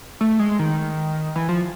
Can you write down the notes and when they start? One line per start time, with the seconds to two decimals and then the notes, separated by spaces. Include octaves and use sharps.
0.21 A3
0.39 G#3
0.59 D#3
1.36 E3
1.49 F3